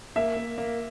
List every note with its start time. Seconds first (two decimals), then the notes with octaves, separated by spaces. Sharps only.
0.16 A#3 E5
0.36 A#3
0.58 A#3